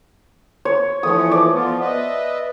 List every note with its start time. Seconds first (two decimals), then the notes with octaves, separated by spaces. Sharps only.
0.65 C#5
1.03 E3 F3 A3 C#5 D#6
1.32 D5
1.54 F3 B3 F4
1.81 B4 D#5 E5